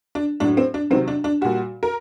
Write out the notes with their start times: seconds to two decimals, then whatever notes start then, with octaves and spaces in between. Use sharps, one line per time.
0.15 D4
0.40 A2 F#3 D4
0.57 C4
0.74 D4
0.90 C3 D#3 F#3 C4
1.08 D4
1.24 D4
1.41 A#2 G3 F#4
1.83 A#4